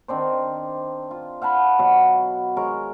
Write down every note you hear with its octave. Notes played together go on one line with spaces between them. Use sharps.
D#3 C4 D4 C5
F4
F5 F#5 A5 B5
B2 F#3 F5 F#5
G#3 A#4 C#5